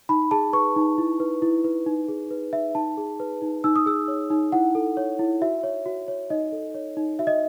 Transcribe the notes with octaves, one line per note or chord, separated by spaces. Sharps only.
D#4 B5
G#4 A5
B4 C#6
D#4
E4
B4
E4
B4
D#4
G#4
B4
D#4 E5
D#4 A5
G#4
B4
D#4
D#4 E6
D#6
G#4 E6
C#5
D#4
E4 F#5
A4
C#5
E4
F#4 E5
C#5
F#4
C#5
D#4 D#5
A4
C#5
D#4
F#4 E5
D#5